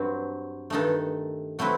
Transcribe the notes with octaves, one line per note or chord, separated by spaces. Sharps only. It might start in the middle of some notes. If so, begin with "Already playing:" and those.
Already playing: G2 F#3 C4
G2 D#3 A3 D#4 A4
F#3 A3 C4 E4 B4